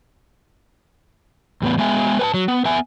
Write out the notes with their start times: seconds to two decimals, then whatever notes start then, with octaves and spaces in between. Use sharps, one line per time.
1.62 E2 A2 B3
1.78 G#3 B3 E5 G#5
2.19 B4 G#5 A5
2.34 F#3
2.48 B3
2.65 B3 E5 G#5